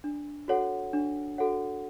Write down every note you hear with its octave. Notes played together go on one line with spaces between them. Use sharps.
D4
F#4 A4 C#5 F#5
D4
F#4 A4 C#5 F#5